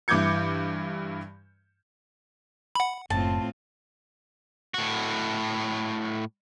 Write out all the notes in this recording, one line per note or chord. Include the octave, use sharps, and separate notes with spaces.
G2 E3 D6 G6 G#6 C#7
F#5 B5
F#1 A2 C4 F4 A5
A2 F#4